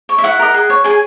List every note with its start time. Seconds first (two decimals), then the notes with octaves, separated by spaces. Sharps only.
0.09 C#5
0.18 E5
0.23 E4 F#5
0.39 A#4 D#5
0.54 G#4
0.70 C#5
0.84 G#4 G#5